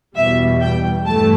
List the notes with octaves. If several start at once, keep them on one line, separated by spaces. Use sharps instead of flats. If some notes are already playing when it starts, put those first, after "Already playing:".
E2 B2 G3 E5
G5
G2 E3 A3 A5